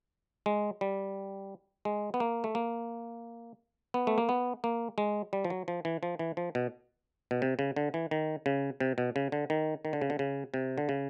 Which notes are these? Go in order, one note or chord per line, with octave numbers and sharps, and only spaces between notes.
G#3
G3
G#3
B3
A#3
A3
A#3
B3
A3
A#3
B3
A#3
G#3
G3
F3
F#3
F3
E3
F3
E3
F3
B2
B2
C3
C#3
D3
E3
D#3
C#3
C3
B2
C#3
D3
D#3
D#3
D3
C#3
D3
C#3
C3
D3
C#3